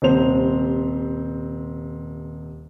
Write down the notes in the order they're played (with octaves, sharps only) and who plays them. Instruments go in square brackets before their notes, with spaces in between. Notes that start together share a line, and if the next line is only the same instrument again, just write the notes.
[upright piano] D#1 C3 C5 F7